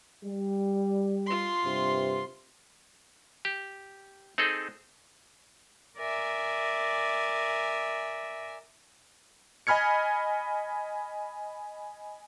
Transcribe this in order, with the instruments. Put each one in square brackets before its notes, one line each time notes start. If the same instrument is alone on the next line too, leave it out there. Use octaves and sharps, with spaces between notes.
[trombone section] G3
[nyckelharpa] F4 C6
[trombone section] G2 C3
[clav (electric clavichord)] G4
C4 D#4 G#4 A4
[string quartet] A#4 D5 E5 G#5
[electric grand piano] D#5 G#5 B5 F6 G#6 C#7